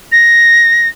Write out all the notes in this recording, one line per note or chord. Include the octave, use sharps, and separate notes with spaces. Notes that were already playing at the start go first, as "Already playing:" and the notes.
A#6